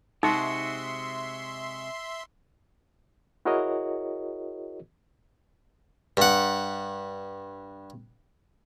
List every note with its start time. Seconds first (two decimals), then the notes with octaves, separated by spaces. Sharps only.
0.23 C3 G#3 D#4 F#4 E5 C6
3.45 E4 F#4 G#4 A#4 C#5 D#5
6.17 G2 F#5